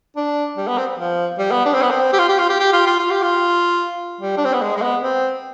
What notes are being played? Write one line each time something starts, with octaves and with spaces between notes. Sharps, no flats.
D4
G3
B3
C4
F3
G3
B3
D4
C4
B3
C4
G4
F4
G4
F4
G4
G4
F4
F4
F4
G4
F4
G3
D4
C4
B3
G#3
G#3
B3
C4